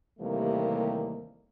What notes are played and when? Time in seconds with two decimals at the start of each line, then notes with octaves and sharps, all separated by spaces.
0.19 D#2 C3 E3 G3 A3 A#3